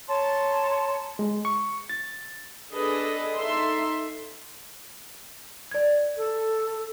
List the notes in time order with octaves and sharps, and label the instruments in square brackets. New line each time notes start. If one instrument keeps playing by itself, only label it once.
[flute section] C#5 A5 A#5 C6
[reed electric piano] G#3
C#6
A6
[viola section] D4 G#4 A4 B4 D#5
D#4 A4 E5 C6
[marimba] D5 G#6
[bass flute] A4